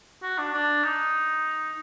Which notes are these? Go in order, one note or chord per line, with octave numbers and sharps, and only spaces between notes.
F#4
D4
D4
D#4